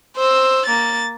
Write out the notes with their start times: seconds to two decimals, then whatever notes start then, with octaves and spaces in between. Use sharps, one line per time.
0.17 C5 E6
0.65 A#3 A6